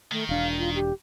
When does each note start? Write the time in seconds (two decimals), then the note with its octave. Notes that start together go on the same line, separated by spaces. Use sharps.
0.12 D#3 A3
0.29 E1 D4 F5
0.59 F4
0.75 G4